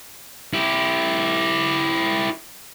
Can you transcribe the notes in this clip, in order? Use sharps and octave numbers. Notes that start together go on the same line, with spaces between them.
E4 G4